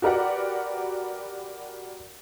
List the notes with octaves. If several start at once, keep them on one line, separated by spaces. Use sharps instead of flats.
F#4 G4 A#4 B4 D5 F#5